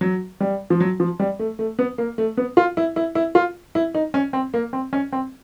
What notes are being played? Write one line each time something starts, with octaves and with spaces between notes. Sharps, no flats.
F#3
G3
F3
F#3
F3
G3
A3
A3
B3
A#3
A3
B3
F4
E4
E4
E4
F4
E4
D#4
C#4
C4
A#3
C4
C#4
C4